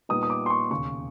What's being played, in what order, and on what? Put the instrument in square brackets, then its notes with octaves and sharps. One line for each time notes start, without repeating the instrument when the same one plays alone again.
[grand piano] A#2 G3 B3 D#4 D#6
D#6
D6
C6
C#6
E1 D#2 C#3 C#6